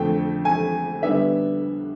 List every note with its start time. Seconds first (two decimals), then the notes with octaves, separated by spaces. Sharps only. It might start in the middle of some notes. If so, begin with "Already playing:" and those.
Already playing: F2 D3 F3 A3 G5
0.45 G#5
1.02 D3 G3 B3 D4 E5